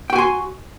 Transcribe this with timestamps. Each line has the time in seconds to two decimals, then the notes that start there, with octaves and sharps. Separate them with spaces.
0.10 G5
0.13 F#4
0.15 G#5
0.18 C6